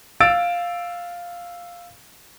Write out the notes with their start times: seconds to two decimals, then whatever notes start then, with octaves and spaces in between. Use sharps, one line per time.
0.20 F5 E6 A6 D7